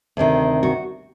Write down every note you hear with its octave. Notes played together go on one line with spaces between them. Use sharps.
D2 C3 D#3
F#4